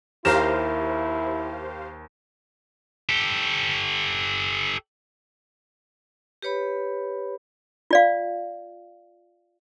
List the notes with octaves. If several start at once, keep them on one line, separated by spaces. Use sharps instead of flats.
D#2 E4 G4 A#4 C5 F5 E7
G4 A4
G4 B4 C#5 B5
F4 D5 F5